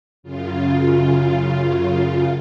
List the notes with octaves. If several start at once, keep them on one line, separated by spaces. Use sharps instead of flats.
F#2 C#3 F4